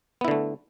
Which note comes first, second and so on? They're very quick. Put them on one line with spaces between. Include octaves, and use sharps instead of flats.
B3 E4 D3 A3